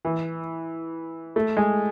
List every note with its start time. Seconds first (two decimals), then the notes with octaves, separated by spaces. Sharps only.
0.05 E3
1.36 A3
1.57 G#3